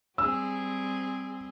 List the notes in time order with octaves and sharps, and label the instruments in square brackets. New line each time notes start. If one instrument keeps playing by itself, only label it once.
[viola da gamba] G3 C4 G#4 [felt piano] E6